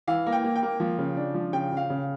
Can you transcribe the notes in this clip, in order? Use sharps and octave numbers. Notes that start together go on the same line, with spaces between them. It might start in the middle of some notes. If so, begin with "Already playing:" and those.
E3 F5
A#3
G5
A#3
G5
A#3
F3
C#3
D4
F3
C#3 G5
C#3 F5
C#3